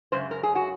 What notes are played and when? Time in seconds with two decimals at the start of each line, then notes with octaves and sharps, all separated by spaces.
0.12 F#2 C#3 G#3 C5
0.31 A#4
0.43 G#4
0.55 F#4